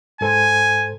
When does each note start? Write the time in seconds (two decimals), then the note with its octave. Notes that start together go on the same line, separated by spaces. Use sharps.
0.21 G#2 A4 C5 G#5